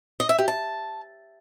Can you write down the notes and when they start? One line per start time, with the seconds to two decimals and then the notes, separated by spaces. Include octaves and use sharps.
0.20 D#5
0.29 E5
0.38 G4
0.48 A5